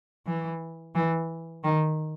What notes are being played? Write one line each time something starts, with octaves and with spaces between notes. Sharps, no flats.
E3
E3
D#3